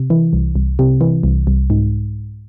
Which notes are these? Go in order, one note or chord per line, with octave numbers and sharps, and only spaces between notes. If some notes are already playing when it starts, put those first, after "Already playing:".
Already playing: C3
E3
C2
C2
C3
E3
C2
C2
G#2